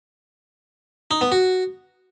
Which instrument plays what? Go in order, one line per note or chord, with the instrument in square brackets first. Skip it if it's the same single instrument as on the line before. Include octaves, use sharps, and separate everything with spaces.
[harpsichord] D#4
B3
F#4